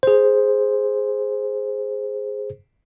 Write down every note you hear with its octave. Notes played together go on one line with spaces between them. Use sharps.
G#4 C5